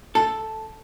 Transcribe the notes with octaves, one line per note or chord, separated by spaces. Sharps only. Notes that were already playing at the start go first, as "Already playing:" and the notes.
A4